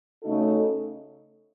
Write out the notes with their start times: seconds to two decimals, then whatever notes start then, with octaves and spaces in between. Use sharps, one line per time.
0.23 C#3 A3 D#4 F#4 A4